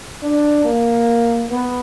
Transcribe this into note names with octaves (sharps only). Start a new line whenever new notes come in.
D4
A#3
B3